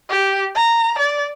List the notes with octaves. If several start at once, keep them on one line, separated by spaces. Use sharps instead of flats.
G4
A#5
D5